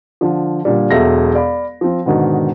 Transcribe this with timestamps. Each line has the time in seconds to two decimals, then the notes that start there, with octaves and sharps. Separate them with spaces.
0.21 D3 F3
0.65 A#2 D3 G3
0.91 E1 F#3 A4 E5 F5 A#6
1.35 D5 F5 B5
1.81 F3 C4
2.06 G#2 B2 D3 D#3